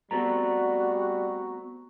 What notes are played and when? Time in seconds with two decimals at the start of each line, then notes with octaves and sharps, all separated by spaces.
0.11 G3 A3 B3 C4 F#4 A#5